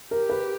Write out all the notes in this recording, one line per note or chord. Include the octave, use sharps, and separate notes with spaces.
G4 A#4
B4